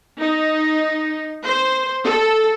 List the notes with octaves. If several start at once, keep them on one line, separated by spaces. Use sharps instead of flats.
D#4
C5
A4